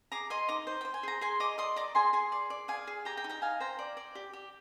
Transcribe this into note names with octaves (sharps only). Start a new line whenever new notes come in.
G#4 A#5 D6
D#5 G#5 C6
D#4 A#5 D6
C5
C5 G5
G#5
G#4 A#5
G#4 G#5 C6
D#5 A#5 D6
D5 C6 D#6
D5 A#5 D6
G#4 G#5 C6
G#4 G#5 C6
D5
D5
G#4 F5 G#5
G#4
G4 G5 A#5
G5 A#5
D#4
G5 A#5
D#4 F5 G#5
C5 G5 A#5
D5
D5
G4
G4